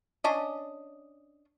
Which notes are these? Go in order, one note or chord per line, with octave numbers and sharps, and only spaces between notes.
C#4 D4 D#5